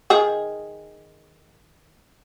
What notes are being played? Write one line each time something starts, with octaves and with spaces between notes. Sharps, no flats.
D#3 G#4